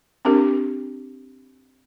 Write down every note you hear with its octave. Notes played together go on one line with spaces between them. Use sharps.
C4 D4 G4 A#4